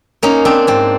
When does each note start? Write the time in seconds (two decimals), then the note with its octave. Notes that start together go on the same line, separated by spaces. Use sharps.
0.22 A#3 C#4 D#4
0.45 C4 D4
0.67 G#2 C4